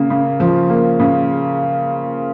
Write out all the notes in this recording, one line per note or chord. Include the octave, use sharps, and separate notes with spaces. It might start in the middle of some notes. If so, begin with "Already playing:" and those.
Already playing: C#3 A#3
C#3
F3
A#3
C#3